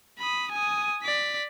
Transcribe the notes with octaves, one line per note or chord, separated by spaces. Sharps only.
B5 D#6
G#5 D#6
D5 B6